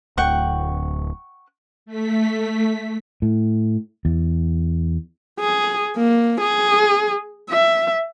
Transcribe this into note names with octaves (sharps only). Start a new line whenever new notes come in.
D1 D2 F#5 G5 C#6
A3 B6
A2
E2
G#4
A#3
G#4
E5